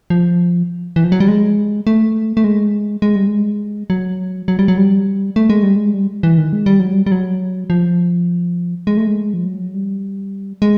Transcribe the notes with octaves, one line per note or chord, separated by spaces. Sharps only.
F3
E3
F3
F#3
G3
G#3
A3
A3
G#3
G#3
G3
G#3
F#3
F#3
G3
F#3
G3
A3
G#3
G3
G#3
G3
E3
D#3
G#3
G3
F#3
G3
G3
F#3
F3
G#3
A3
G#3
F3
F#3
G3
G#3